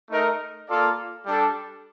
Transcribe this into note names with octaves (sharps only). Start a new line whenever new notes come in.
A3 D#4 A#4 D#5
A#3 F4 A4 D5 F5
G3 D4 A4